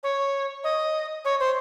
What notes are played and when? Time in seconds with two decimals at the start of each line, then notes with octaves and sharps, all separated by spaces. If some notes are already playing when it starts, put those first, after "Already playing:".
0.03 C#5
0.64 D#5
1.25 C#5
1.40 C5